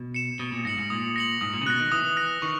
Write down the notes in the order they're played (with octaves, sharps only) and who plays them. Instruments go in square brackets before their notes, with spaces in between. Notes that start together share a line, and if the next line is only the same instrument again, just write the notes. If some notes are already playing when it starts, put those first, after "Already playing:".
Already playing: [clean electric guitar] B2
[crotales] C#7 E7
[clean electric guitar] B2 [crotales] D#6
[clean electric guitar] A#2
[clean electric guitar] G#2 [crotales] A#6 C#7 F#7
[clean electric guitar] G#2
[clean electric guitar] A#2 [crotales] D#6
[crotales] A#6 C#7 F#7
[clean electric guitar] G#2 [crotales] D#6
[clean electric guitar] A#2
C#3
[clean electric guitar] B2 [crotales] F#6 A#6
[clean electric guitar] D#3
[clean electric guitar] E3 [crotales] D#6
[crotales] F#6 A#6
[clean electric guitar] D#3 [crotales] C#6